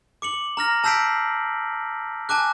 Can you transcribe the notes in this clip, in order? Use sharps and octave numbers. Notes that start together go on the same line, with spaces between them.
D6 C#7 F#7
A#5 F6 A#6
A5 E6 G6 B6 C7 D7
G#5 A5 D6 F#6